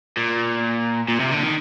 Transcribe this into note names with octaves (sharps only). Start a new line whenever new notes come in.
A#2
A#2
C3
D3
D#3